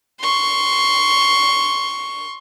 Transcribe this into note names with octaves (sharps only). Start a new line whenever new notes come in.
C6 C#6